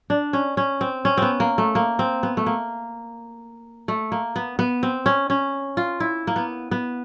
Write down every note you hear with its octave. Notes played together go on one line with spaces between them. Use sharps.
D4
C#4
C#4
C4
C#4
B3 C4
A#3
A3
A#3
C4
B3
A3
A#3
A3
A#3
B3
B3
C4
C#4
C#4
F4
E4
A#3
B3
B3